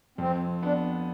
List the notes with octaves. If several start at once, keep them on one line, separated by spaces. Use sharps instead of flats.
F2 C4
B3 D4